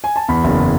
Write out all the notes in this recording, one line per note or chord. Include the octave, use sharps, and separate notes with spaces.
G#5
A5
E2 B5
F#1